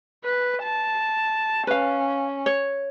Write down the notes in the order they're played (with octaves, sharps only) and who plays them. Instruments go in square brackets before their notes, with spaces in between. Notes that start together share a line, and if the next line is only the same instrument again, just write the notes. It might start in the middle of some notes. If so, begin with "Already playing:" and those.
[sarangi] B4
A5
[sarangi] C#4 [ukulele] B4 F5
[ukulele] C#5